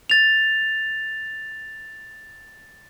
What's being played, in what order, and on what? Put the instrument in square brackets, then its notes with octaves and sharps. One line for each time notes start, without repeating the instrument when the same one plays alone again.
[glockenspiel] A6 F7